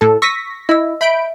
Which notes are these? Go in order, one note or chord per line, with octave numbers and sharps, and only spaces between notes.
A2 A4
C#6 E6 A#6 B6 D#7
E4 D#5 E6
E5 B5 G6 D7